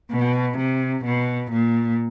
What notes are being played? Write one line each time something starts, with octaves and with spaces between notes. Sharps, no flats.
B2
C3
B2
A#2